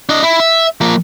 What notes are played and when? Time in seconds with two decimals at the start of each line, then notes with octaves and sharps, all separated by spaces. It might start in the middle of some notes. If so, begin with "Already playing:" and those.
0.09 D4 D#5
0.23 E4
0.40 E5
0.81 F3 A#3